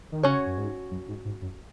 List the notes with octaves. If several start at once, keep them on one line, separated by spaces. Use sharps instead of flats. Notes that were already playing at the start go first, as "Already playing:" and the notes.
D#3
C#3 C#4 F#4 C#5
F#2
G#2
F#2
G#2
G#2
F#2